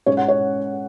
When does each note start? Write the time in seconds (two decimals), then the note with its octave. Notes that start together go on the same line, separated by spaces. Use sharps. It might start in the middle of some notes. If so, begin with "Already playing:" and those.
0.06 G#2 G#3 C#4 C#5
0.17 F#5
0.28 C#5